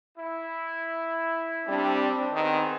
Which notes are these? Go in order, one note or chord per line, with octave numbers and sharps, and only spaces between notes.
E4
G3 C4 D4
D#3 B3 C4 G#4 B4